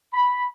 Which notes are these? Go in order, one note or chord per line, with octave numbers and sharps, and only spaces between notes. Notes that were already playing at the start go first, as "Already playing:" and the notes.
B5